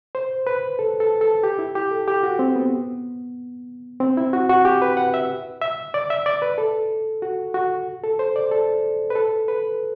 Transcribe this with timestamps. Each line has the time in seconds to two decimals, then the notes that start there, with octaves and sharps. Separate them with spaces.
0.15 C5
0.47 B4
0.79 A4
1.00 A4
1.21 A4
1.44 G4
1.59 E4
1.75 G4
1.91 A4
2.08 G4
2.23 F#4
2.39 C4
2.56 B3
4.00 C4
4.17 E4
4.33 F#4
4.49 F#4
4.65 G4
4.82 B4
4.97 F#5
5.14 E5
5.62 E5
5.94 D5
6.10 E5
6.26 D5
6.42 B4
6.58 A4
7.22 F#4
7.54 F#4
8.04 A4
8.19 C5
8.36 D5
8.51 A4
9.10 B4
9.15 A4
9.48 B4